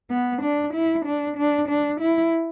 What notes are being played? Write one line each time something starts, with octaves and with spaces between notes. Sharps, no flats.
B3
D4
E4
D4
D4
D4
E4